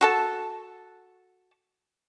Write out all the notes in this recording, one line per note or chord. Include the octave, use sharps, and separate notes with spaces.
F#4 A4 A5